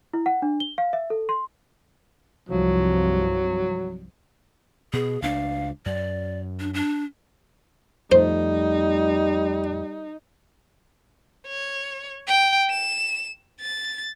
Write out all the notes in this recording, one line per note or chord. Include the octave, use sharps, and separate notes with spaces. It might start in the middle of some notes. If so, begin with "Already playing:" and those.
E4
F#5
D4
G7
F5
E5
A4
C6
C2 G2 F3 F#3
B2 G#4
C#2 C#4 D4 F5
F#2 D5
D4
D4
F2 G3 A3 D#4 C5
C#5
G5
E7
A6